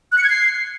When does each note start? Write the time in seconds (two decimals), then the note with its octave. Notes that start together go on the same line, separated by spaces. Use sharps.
0.12 F#6
0.18 C#7
0.24 G#6
0.30 C7